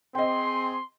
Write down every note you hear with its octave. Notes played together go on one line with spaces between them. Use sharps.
C4 G#4 D#5 G5 C6